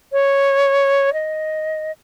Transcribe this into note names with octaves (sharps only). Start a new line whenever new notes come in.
C#5
D#5